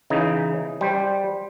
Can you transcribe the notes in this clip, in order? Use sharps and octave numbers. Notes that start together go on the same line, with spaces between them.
C#3 E3 D#4
G3 C5